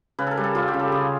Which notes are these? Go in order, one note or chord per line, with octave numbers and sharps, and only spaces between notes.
C#3 B4
A4 A#4
G3
A4
G3 F4
G4
C#3
A4
C#3 G#4